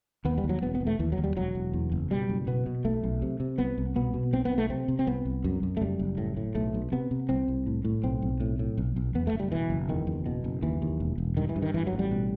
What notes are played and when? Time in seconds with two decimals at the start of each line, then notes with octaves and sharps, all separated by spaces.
0.25 D#2 B3
0.38 G3
0.44 D#2
0.49 F#3
0.62 E1 B3
0.75 B3
0.81 E1
0.87 A3
0.99 D#2 E3
1.12 F#3
1.18 D#2
1.24 G3
1.36 E1 F#3
1.55 E1
1.73 E2
1.92 F#1
2.11 B2 G3
2.29 F#1
2.47 B2 B3
2.66 B2
2.85 B1 A3
3.04 B1
3.22 C3
3.40 C3
3.58 C2 B3
3.78 C2
3.96 B2 B3
4.14 B2
4.33 B1 C4
4.45 B3
4.51 B1
4.58 A3
4.70 C3 C4
4.88 C3
4.99 C4
5.07 C2 B3
5.25 C2
5.44 F#2
5.63 F#2
5.77 A3
5.81 F#1 G3
5.99 F#1
6.18 A2
6.37 A2
6.55 B1 A3
6.74 B1
6.92 C3 B3
7.11 C3
7.29 C2 C4
7.48 C2
7.66 A2
7.85 A2
8.03 B1 C4
8.22 B1
8.40 A2
8.59 A2
8.78 B1
8.96 B1
9.14 E2 B3
9.27 A3
9.33 F#1
9.39 G3
9.52 B2 E3
9.70 F#1
9.89 E2 D#3
10.07 F#1
10.26 B2
10.44 F#1
10.62 D#2 E3
10.82 D#2
11.00 E1
11.18 E1
11.37 G2 D#3
11.49 E3
11.56 G2
11.62 D#3
11.74 A1 E3
11.87 F#3
11.93 A1
11.99 G3
12.11 B2